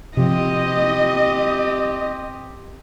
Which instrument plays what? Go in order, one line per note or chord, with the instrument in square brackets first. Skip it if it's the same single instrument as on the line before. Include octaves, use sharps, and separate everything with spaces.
[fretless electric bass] C3 F3 [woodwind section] C4 G4 [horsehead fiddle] D#5